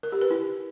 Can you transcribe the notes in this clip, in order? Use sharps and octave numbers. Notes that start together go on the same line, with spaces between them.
A#4
G4
B4
E4